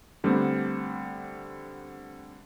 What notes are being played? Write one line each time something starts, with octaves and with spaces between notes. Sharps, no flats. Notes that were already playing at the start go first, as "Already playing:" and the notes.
D3 G3 A3 B3 C4